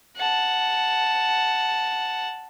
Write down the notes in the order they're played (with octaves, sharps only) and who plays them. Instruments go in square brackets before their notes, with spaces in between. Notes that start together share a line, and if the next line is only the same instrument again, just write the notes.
[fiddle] F#5 A5